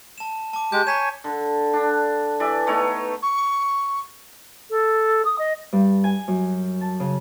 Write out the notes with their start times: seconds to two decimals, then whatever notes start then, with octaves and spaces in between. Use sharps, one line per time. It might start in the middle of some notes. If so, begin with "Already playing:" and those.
0.18 A5 E7
0.53 A5 D6
0.72 G#3 G4 D6 G6
0.87 C#5 G#5 A#5 B6 E7
1.24 D3
1.73 D4
2.40 E3 D5 E5
2.67 A3 B3 D#4 C#5
3.23 C#6
4.70 A4
5.25 D#6
5.39 D#5
5.73 G2
6.04 G#5
6.28 F#2
6.81 A5
7.00 C#3